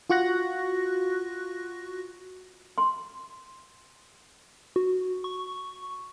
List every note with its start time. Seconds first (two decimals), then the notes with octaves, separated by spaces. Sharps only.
0.10 F4 F#4 C#6 F#6 A#6
2.78 C6
4.76 F#4
5.24 C#6